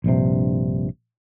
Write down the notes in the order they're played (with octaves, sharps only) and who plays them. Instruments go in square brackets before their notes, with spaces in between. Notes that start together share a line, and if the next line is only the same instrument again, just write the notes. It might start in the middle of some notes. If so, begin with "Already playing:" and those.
[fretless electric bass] A#1 G2 C3